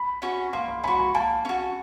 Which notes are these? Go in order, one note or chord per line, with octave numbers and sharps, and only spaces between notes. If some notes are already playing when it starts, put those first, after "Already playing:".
Already playing: B5
C#4 F#4
A#3 C6
C6
C#4 F#4 B5
B5
A#3 A5
C#4 F#4